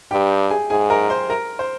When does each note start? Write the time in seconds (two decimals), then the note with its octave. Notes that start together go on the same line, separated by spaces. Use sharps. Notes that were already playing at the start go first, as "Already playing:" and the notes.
0.11 G2 G4 G5
0.50 G#4 G#5
0.70 G#2 G#4 G#5
0.90 A#4 A#5
1.10 C5 C6
1.30 A#4 A#5
1.59 C5